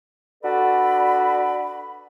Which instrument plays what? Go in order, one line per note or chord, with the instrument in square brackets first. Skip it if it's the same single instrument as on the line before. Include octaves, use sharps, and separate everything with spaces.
[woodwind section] D4 F#4 A4 B4 D5 B5